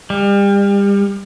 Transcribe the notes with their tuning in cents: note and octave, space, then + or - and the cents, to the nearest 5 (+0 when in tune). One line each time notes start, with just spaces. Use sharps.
G3 +35